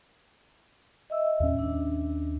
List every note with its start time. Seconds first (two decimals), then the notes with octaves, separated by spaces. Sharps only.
1.10 D#5 E5 E6
1.40 D#2 A2 C#4
1.59 D4